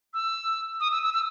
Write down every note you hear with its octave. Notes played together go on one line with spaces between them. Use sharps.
E6
D#6
E6
E6
E6